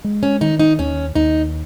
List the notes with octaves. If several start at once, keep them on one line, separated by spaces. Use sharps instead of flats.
G#3
C#4
D#3 D#4
D#4
D#2 C#4
D#2 D#4